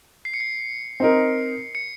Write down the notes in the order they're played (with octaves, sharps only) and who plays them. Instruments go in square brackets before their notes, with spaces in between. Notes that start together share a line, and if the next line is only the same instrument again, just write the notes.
[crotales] C7
C#7
C7
[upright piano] C4 D#4 A#4
[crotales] C#7